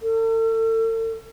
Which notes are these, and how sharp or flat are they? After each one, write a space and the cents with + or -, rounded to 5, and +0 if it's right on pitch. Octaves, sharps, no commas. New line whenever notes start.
A4 +40